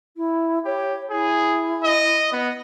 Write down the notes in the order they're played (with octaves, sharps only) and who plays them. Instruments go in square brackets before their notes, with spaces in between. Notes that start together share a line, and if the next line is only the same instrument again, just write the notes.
[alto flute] E4
[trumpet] G4 [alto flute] C#5
[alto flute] E4 [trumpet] G#4
[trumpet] D#5
B3